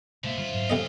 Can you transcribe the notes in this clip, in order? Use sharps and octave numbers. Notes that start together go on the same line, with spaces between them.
B2 D3 G#3 A#3 B3 C5 E5 F5
F#2 D3 G3 F4
G#2 F#3
G2 C3 F3 G3 A4 D#5